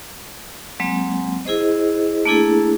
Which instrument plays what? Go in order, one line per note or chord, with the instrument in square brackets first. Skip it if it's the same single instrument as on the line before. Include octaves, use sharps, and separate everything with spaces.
[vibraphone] F#3 G#3 A#3 C4
E4 G#4 C5 D#5
A3 A#3 D4 E4 G#4 A4